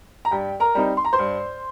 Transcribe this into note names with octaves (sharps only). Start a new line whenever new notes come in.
A#5
G2 G4 G5
A#4 A#5
G3 C4 D#4
C6
A#5
C5 C6
G2